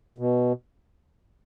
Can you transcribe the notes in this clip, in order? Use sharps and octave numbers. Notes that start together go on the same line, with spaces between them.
B2